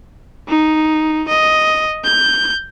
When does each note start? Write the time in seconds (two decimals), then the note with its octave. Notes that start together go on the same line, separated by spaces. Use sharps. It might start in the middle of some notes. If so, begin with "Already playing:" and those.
0.48 D#4
1.29 D#5
2.04 G6